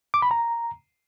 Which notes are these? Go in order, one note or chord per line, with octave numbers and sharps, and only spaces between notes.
D6
B5
A#5